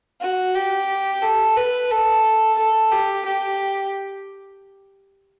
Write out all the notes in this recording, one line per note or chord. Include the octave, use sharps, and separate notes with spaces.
F#4
G4
A4
B4
A4
A4
G4
G4